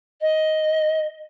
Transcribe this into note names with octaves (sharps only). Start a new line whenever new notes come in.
D#5